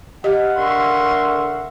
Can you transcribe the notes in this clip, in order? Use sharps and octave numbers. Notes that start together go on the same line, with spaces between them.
G4 D#5 F5 F#5
D3 A#4 E5 C6 C#6